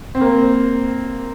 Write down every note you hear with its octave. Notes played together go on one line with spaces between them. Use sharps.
C4
A#3